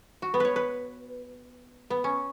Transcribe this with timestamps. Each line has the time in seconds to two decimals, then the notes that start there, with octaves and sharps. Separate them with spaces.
0.22 F#4
0.34 B3
0.40 B4 C#5
0.56 B4
1.90 B3
2.04 C#4